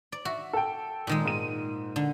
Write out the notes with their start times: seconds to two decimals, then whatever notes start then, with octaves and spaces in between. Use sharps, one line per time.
0.12 D5
0.25 F#4 E5
0.53 A4 G5
1.07 A#2 D#3 G#3
1.25 G#2 D#7
1.96 D3